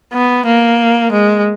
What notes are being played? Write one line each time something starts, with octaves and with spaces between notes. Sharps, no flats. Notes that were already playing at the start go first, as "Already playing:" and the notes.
B3
A#3
G#3